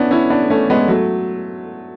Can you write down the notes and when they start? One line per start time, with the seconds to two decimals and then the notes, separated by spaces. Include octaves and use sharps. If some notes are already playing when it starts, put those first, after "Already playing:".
Already playing: B3 C#4 D4 E4
0.11 C#4 E4
0.30 B3 D4
0.50 A3 C#4
0.70 G#3 B3
0.88 F#3 A3